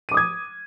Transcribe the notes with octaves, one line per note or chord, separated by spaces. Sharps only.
D6 D#6 G#6 D#7